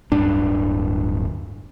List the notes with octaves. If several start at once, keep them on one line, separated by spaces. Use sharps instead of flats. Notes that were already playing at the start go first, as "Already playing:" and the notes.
D1 G2 D4